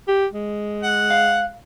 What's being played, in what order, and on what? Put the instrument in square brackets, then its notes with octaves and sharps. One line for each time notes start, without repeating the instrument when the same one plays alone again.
[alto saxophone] G4
G#3
[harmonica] F#5
[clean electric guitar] F5